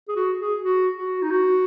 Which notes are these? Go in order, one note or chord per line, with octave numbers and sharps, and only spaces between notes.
G#4
F#4
G#4
F#4
F#4
D#4
F#4